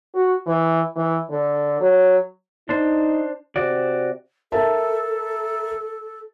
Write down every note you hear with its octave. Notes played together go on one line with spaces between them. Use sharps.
F#4
E3
E3
D3
F#3
D4 D#4 C5
C3 F#4 D5
A4 A#4 E5 A5